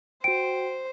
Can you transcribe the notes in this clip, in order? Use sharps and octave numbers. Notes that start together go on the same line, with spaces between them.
F#4 C5 G5 D7